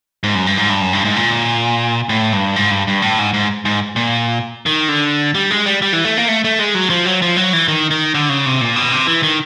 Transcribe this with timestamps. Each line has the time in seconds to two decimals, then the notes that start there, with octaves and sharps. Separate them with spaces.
0.23 G#2
0.35 F#2
0.47 G2
0.58 G#2
0.69 G2
0.81 F#2
0.93 G2
1.05 G#2
1.16 A#2
2.09 A2
2.32 G2
2.56 G#2
2.71 G2
2.87 G2
3.02 A2
3.19 G#2
3.34 G#2
3.65 G#2
3.96 A#2
4.66 D#3
4.88 D3
5.35 G3
5.51 G#3
5.66 G3
5.82 G3
5.93 E3
6.04 A3
6.17 A#3
6.28 A3
6.44 A3
6.59 G#3
6.75 F#3
6.90 F3
7.05 F#3
7.22 F3
7.37 F#3
7.53 E3
7.68 D#3
7.91 D#3
8.14 D3
8.29 C#3
8.46 C3
8.61 A#2
8.76 B2
8.92 C3
9.07 E3
9.23 D#3